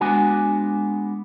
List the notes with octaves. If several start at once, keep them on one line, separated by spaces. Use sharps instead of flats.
G#3 B3 D4 F#4 G#5